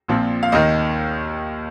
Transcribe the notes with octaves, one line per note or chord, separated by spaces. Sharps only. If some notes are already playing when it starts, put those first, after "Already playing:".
A#1 A#2 F3 C4
F5
D#2 D#3 A#3 D#5